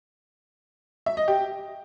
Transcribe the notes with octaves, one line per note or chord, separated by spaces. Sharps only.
E5
D#5
G4